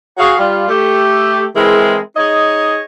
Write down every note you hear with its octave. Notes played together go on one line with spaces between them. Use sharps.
F#4 G#4 F5
G3 F4
A3 G4
E3 G#3 C4 E4 G#4 A#4
D#4 G#4 C#5 D#5